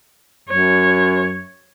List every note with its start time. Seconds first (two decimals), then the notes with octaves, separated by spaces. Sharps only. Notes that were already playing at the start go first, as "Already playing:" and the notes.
0.49 F#2 C#5